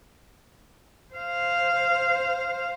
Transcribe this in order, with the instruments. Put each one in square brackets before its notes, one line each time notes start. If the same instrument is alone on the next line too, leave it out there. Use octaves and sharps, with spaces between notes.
[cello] C5 F5